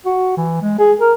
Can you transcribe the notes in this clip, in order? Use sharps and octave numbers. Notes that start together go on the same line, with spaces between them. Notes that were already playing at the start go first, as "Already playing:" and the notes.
F#4
E3
G#3
G#4
A#4